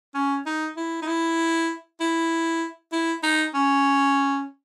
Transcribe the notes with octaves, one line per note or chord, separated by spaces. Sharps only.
C#4
D#4
E4
D#4
E4
E4
E4
D#4
C#4